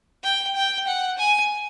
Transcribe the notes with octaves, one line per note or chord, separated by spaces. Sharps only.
G5
G5
F#5
G#5